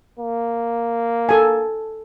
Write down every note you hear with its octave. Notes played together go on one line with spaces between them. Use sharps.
A#3
A4 G#5